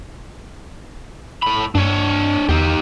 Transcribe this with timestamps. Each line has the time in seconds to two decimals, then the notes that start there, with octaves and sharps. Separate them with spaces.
1.42 A2 B5
1.75 G2 D4 C#5
2.49 E2 D#4 G4